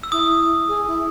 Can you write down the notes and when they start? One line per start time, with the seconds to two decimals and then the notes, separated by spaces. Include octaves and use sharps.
0.03 E6
0.12 E4 D#6
0.68 G#4
0.87 E4